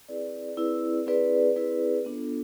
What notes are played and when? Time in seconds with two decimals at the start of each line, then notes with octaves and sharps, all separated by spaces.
0.08 C4 E4 G#4 B4 D5
0.57 C4 E4 G#4 B4 D5
1.06 C4 E4 G#4 B4 D5
1.56 C4 E4 G#4 B4 D5
2.05 B3 D4 F4 A4